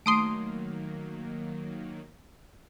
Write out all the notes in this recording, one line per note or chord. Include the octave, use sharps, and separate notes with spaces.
D#3 F#3 A3 A#3 C6 D#6 D7